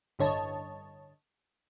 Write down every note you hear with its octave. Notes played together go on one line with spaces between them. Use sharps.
A1 G2 D3 C#5 D#5 A5